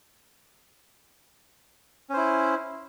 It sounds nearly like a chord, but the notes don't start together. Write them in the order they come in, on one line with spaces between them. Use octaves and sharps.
C#4 C5 E4